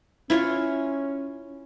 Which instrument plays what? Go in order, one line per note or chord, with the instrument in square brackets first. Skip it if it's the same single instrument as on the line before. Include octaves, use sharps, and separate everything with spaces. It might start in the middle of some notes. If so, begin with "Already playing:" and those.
[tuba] C#4 [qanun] E4 F4 C#5